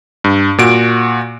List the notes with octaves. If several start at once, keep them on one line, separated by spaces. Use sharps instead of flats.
G2
A#2 F#4 D7